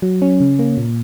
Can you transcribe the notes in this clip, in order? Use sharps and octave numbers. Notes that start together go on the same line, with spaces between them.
F#3
C#4
C#3
A#3
A#2